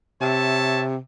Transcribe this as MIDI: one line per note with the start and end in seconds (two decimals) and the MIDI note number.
0.21 0.97 48
0.21 0.85 73
0.21 0.85 76
0.21 0.85 81